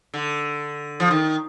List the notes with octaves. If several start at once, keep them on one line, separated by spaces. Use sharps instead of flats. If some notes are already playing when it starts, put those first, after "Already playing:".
D3
F3
D#3